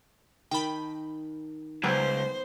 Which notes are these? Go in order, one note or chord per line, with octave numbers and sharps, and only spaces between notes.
D#3 G5 A5 B5
C#2 F#3 G3 B3 C5